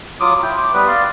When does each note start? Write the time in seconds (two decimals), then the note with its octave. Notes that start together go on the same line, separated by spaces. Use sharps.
0.20 F#3 F4 D6 D#6
0.42 E4 G5
0.58 D6
0.74 G3 B3 B4
0.87 D5 F5 C6